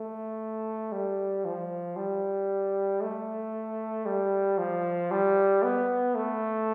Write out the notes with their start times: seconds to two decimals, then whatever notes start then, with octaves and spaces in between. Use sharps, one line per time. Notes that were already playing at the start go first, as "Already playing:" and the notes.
Already playing: A3
0.92 G3
1.45 F3
1.96 G3
3.01 A3
4.05 G3
4.58 F3
5.11 G3
5.63 B3
6.15 A3